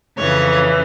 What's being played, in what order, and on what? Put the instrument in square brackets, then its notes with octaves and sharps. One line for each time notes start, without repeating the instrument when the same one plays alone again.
[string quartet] F2 C#3 E3 C#5